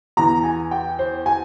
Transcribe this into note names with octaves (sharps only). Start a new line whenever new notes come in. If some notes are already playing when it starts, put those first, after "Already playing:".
E2 E3 A#5
G#5
G5
C5
G#5